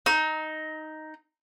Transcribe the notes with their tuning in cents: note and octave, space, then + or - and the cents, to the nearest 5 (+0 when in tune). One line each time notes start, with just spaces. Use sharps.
D#4 +0 D#6 +45